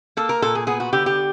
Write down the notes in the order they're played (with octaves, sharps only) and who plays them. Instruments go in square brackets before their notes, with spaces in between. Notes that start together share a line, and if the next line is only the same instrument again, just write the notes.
[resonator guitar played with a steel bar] A#3 A4
A#4
A#2 A4
G#4
B3 G#4
F#4
D3 G4
G4